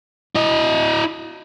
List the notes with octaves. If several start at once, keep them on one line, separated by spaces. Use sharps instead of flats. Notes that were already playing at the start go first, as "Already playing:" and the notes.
E4 D#5